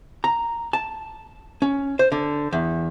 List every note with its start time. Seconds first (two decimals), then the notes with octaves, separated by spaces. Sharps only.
0.24 A#5
0.73 A5
1.62 C#4
1.99 C5
2.12 D3
2.53 E2